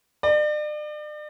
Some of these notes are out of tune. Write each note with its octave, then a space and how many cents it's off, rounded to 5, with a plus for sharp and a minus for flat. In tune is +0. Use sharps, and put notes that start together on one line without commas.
D5 +40